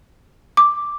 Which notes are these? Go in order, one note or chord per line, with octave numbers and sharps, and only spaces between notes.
D6